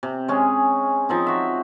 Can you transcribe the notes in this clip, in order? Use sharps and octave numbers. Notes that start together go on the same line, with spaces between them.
C3
G#3 C#4 G#4
F3 C4 D#4
F#4 E5